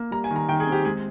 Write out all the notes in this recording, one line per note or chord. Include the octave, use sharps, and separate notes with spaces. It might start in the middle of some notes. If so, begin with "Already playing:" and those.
Already playing: A#3
G3 A#5
G#5
D#3
A#5
D#3 G5
G#4
C4
G4
G#3 G#4